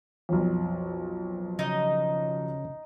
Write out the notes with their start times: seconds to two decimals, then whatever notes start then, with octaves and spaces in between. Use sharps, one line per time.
0.29 B1 F2
1.59 C#3 D#4 D#5